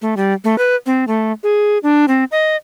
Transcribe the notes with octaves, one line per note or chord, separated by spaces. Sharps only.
A3
G3
A3
B4
C4
A3
G#4
D4
C4
D#5